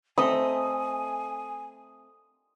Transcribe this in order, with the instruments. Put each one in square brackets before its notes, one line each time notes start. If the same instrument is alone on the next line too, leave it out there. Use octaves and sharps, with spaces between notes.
[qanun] A3 C4 D#5 [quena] G#5 [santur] D#6